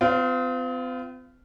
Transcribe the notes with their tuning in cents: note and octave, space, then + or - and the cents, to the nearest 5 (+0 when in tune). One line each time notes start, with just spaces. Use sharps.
C4 -45 F4 -10